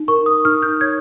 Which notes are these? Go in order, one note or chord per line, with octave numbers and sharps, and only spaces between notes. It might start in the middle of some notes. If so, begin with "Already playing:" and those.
Already playing: D#4
A#4 C#6
D#6
D#4 F6
G6
C#5 G#6